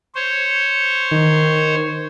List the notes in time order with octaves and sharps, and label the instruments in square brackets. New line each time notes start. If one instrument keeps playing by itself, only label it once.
[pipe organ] C5 C#5
[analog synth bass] D#3